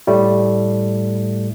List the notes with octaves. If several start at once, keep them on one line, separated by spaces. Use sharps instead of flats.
A2 G3 A3